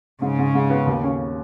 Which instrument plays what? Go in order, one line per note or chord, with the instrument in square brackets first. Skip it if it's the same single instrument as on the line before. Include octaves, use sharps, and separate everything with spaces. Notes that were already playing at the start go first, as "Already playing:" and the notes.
[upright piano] G#2 [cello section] C#3
[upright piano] G#2
G#2
B3
D#2
C#4